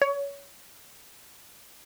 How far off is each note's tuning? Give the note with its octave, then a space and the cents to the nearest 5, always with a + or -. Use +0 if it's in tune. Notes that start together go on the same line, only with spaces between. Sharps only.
C#5 +25